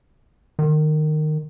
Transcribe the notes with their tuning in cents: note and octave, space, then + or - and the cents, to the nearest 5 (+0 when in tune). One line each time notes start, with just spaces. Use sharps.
D#3 -20